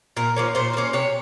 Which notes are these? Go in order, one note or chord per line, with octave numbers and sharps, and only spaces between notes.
A#2 A#4
F3 A#3 C#4
A#2 C5
F3
A#3 C#4
C3 C#5